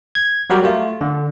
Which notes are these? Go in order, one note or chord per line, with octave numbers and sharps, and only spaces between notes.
G#6
F#3 G3 F#4 G4 A#4
A3 F4
D3